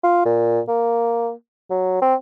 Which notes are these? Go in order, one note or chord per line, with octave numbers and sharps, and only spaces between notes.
F4
A#2
A#3
F#3
C4